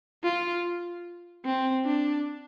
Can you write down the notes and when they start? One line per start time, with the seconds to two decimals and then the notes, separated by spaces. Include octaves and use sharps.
0.24 F4
1.45 C4
1.86 D4